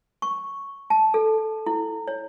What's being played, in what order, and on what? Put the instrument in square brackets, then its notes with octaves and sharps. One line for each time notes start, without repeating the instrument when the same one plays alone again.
[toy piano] C#6
A5
A4
E4
C#5